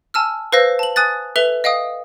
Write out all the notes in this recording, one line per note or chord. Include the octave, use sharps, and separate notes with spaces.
G#5 A5 E6 F6
B4 C5 F5 E6 A#6
A5 F#7
G#5 D#6 F#6 A6
A4 B4 E5 F7 G7
D#5 F5 G5 D#6